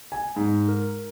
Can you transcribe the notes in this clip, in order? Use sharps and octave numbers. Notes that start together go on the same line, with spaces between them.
G#5
G#2
A#4